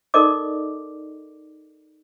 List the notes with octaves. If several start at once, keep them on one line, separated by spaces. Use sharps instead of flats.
D#4 A4 A#4 D5 D#5 D6